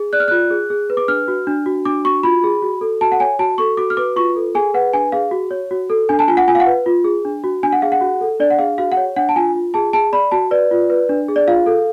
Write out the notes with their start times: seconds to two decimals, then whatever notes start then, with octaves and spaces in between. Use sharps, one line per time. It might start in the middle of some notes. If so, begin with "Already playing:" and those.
Already playing: G#4
0.13 D5 F#6
0.20 F6
0.28 F4 F#6
0.50 G#4
0.70 G#4
0.90 B4
0.97 D6
1.08 D4 F6
1.28 F#4
1.47 D4
1.66 F#4
1.85 D4 D6
2.05 F#4 C#6
2.23 F4 B5
2.44 G#4
2.62 F#4
2.81 A4
3.01 F#4 A5
3.12 F#5
3.20 C#5 G#5
3.39 F#4 A5
3.58 A4 C#6
3.77 F#4 D6
3.90 F6
3.97 B4 D6
4.16 F4 C#6
4.36 A4
4.55 G#4 G#5
4.74 B4 F#5
4.93 D4 G#5
5.12 G#4 F5
5.31 F#4
5.51 C#5
5.71 F#4
5.90 A4
6.09 D4 G#5
6.19 A5
6.28 F4 G#5
6.37 F#5
6.47 F4 G#5
6.55 F5
6.60 F#5
6.66 B4
6.86 F4
7.04 G#4
7.25 D4
7.44 F#4
7.63 D4 G#5
7.73 F#5
7.82 G#4 F5
7.92 F#5
8.01 F#4
8.21 A4
8.40 D4 D5
8.50 F#5
8.59 G#4 F5
8.78 F#4 F5
8.92 F#5
8.97 C#5
9.16 D4 F#5
9.29 A5
9.36 F4 G#5
9.55 F4
9.74 G#4 A5
9.93 G#4 A5
10.13 D5 B5
10.32 F#4 A5
10.51 B4 D5
10.71 F4
10.90 B4
11.09 D4
11.28 G#4
11.36 D5
11.48 F4 F5
11.66 A4